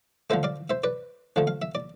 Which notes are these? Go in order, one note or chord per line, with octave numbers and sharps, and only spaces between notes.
D3 F3 A3 C5 E5
D5 F5
C5 E5
B4 D5
D3 F3 A3
F5
E5
D5